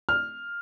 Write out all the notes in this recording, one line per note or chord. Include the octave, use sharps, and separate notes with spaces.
F6